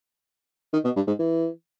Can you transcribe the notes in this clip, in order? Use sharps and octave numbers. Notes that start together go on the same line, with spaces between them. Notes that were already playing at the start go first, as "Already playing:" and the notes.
D#3
B2
G2
G#2
E3